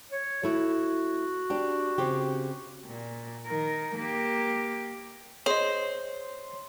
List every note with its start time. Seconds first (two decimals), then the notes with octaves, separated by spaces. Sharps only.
0.11 C#5
0.44 A3 E4 F#4
1.50 D4 G4
1.98 C#3 C4 G4
2.86 A#2
3.47 D#3 A#4
3.97 A#3 G4
5.46 G#4 C5 C#5 D#5